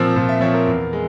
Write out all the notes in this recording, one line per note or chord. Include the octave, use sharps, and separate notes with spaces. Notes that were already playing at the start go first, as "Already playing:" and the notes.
Already playing: A#2 F3 C4 E6
A#2
E5
F3 C4 C#5
A#4
E2
G#3